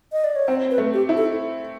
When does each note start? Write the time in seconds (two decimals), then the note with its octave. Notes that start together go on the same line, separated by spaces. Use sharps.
0.12 D#5
0.24 D5
0.36 C#5
0.47 C4 C5
0.71 B4
0.78 A3
0.94 G4
1.09 E4
1.17 A4